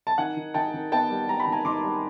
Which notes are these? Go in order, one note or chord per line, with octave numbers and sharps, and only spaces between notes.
A5
D#3 F#5 G#5
D#3
D#3 G5 A5
D#3
B3 G5 A5
G3
G3 A#5
B5
D#3
G#5 A#5
D#3 C6 D6
G3